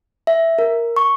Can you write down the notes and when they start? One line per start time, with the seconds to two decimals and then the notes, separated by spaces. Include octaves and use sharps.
0.27 E5
0.59 A#4
0.96 C#6